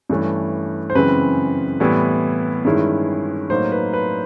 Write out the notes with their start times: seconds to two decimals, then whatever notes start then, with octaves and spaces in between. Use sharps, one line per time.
0.09 G2 E3 A3 C#4
0.90 C5
0.95 F#2 C#3 E3 G#3 C4 B4
1.80 A2 E3 G3 B3 E4
2.65 G2 D#3 G#3 C#4 E4
3.50 A2 F#3 A#3 D#4 C5
3.72 B4
3.93 B4